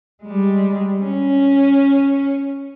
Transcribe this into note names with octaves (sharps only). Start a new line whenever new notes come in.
G3 G#3
C#4